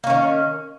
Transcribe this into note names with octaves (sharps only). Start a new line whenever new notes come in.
D#3 A#3 C#4